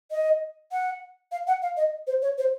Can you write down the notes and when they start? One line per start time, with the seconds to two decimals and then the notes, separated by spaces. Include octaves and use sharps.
0.11 D#5
0.72 F#5
1.32 F5
1.47 F#5
1.62 F5
1.77 D#5
2.07 C5
2.22 C#5
2.38 C5